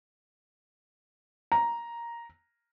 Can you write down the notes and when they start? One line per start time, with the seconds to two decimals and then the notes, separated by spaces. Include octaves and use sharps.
1.52 A#5